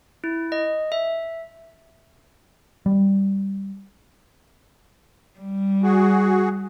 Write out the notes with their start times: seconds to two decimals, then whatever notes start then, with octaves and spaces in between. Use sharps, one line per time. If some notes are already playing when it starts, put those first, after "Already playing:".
0.24 E4
0.52 D#5
0.92 E5
2.86 G3
5.39 G3
5.83 F#4 G#4